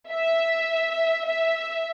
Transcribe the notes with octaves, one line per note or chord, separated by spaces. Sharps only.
E5
E5